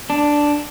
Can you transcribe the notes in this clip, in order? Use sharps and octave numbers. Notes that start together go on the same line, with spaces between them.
D4